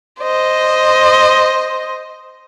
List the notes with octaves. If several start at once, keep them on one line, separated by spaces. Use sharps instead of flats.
C5 D#5